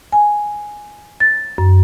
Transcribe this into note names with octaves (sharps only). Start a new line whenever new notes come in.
G#5
A6
F#2